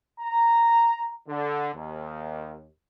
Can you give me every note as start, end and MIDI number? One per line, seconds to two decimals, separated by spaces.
0.20 1.15 82
1.28 1.69 50
1.74 2.65 39